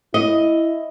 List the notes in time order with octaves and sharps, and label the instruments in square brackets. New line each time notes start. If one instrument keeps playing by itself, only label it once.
[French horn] E4 [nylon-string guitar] D#5